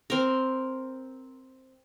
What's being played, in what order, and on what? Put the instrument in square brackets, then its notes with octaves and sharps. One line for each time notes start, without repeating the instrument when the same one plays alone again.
[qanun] C4 A#4